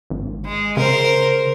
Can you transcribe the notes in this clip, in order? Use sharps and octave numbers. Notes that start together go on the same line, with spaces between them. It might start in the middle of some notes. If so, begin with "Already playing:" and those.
G#1
G#3
C#3 A#4 C5